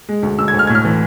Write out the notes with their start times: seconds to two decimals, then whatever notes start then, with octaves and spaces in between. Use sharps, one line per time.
0.09 G#3
0.23 D2
0.38 D2 E6
0.48 G#6
0.54 D2
0.59 F6
0.67 A2 G#6
0.75 F6
0.85 E3